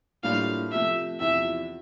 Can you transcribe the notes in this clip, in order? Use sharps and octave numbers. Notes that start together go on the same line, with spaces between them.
A2 G3 A#3 D4 F4 F5
C3 F3 A3 E5
E2 C3 F3 E5